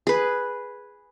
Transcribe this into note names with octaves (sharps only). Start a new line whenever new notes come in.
G#4 B4